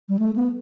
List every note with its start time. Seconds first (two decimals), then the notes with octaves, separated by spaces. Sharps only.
0.09 G3
0.19 A3
0.36 B3